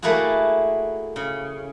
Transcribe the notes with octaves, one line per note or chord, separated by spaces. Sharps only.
A3 A#3 E4 F#4 G#4
C#3